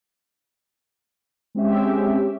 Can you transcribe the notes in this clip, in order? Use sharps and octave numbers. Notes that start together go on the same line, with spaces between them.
G#3 C4 C#4 G4 E5